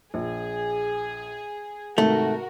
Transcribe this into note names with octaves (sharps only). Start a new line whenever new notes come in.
A#1 G#4
G#2 C3 D#3 A3 F#4 A#4